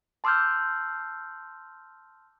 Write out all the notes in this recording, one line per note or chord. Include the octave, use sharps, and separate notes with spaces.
A5 C6 D6 E6 F6 G6